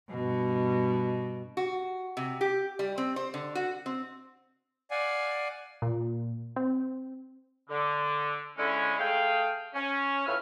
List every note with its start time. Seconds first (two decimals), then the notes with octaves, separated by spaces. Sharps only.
0.11 G2 B2
1.57 F#4
2.17 C3
2.41 G4
2.79 G3
2.98 C4
3.16 C5
3.34 D3
3.55 F#4
3.86 C4
4.91 D5 F5 F#5 G#5
5.82 A#2
6.56 C4
7.70 D3
8.57 D3 G#3 C#4 E4
8.99 A3 G#4 F5 G5
9.74 C#4
10.27 A2 F4 B4 E5 F6